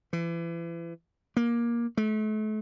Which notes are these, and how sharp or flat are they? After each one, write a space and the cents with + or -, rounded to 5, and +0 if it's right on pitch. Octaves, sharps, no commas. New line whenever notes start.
E3 +35
A#3 +15
A3 -35